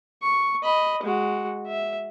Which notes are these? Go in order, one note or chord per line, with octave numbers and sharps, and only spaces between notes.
C#6
D#5 B5
G#3 F#4
E5